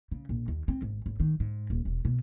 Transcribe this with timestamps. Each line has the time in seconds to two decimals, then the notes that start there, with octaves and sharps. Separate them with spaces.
0.12 C#3
0.29 A#1
0.48 D#2
0.68 C4
0.82 G#1
1.06 G#1
1.20 D#3
1.40 G#2
1.70 D#1
1.85 E1
2.05 B2